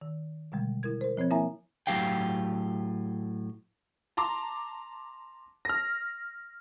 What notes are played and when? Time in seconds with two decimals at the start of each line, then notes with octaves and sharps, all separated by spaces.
0.01 D#3
0.52 B2 D3 G3 G#3
0.83 E4 A#4 G#6
1.01 A#4 C5
1.17 F3 C4 C#5 G#6
1.31 A#3 E4 A#4 E5 G#5 A#5
1.87 A2 F#3 C#4 G4 F5 G5
4.17 A5 A#5 C6 D6
5.65 F6 A#6